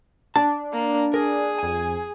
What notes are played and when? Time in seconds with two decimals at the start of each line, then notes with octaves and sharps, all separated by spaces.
0.36 D4 A5
0.73 A#3
1.14 G#4 A#4
1.58 F2 G#5